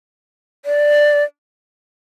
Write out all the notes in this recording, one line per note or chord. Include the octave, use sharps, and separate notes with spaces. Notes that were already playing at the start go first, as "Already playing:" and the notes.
D5